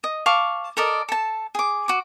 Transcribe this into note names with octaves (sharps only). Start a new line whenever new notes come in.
D#5
F5 A5 C#6 D6
A4 A#4 D5 D#5
A4 A5
G#4 D6
F#4 D6